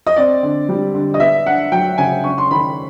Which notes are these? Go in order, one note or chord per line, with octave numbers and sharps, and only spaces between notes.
D#5
C4 D5
D3
G3
D3
D#5
B3 E5
D4 F#5
F#3 G5
C#3 G#5
C#4 C#6
C6
D#3 B5